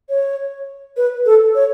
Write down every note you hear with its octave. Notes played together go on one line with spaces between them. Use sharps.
C#5
B4
A4
C#5